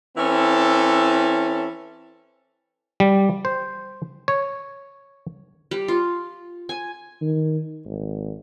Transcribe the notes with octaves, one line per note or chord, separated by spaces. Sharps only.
E3 C4 C#4 E4 A4
G3
C5
C#5
G3
F4
G#5
D#3
G#1